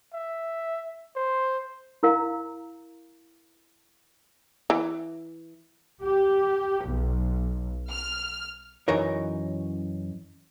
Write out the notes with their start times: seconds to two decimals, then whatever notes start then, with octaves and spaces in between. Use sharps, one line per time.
0.14 E5
1.16 C5
2.03 E4 A#4 F5 A#5
4.70 E3
6.04 G4
6.86 B1
7.90 F6
8.88 F#2 E3 D#4 A#4 C#5